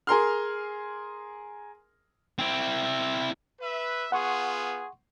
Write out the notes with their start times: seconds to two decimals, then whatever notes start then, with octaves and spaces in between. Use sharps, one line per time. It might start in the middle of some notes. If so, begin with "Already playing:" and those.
0.07 G#4 A#4 C6 F6
2.38 C4 E4
3.61 B4 E5
4.12 B3 F4 G#4 F#5 C6 C#6